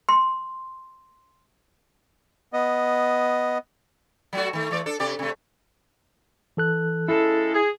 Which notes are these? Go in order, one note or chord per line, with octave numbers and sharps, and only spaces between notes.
C6
B3 D#5
F#3 A3 F#4
D#3 A3
E3 A3 D5
D4 A4
C3 G4 D5
C3 A3
E3 A4 F#6
C#3 G#3 E4 A4
G#4